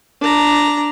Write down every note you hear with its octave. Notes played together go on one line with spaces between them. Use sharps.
D4 A#5